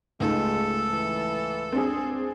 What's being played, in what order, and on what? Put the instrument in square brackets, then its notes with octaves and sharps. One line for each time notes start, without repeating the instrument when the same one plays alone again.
[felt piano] C#2 G#2 A3 [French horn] G#3 [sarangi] A4
[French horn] E3
[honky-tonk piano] C4 D4 G#4